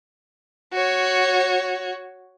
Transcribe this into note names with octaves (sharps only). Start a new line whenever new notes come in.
F#4 C#5